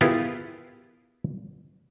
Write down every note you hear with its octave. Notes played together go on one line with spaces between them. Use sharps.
B3 E4 F4 G4 G#4 A#4